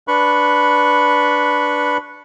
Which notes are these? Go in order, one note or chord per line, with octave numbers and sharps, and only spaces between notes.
D4 B4 B5 C#6